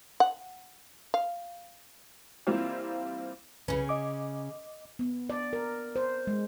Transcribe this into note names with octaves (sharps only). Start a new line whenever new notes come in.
F#5
F5
E3 G3 A#3 C4 E4 F4
C2 C#3 C#4 B4
D#5 D6
B3
D5
A#4
C5
G#3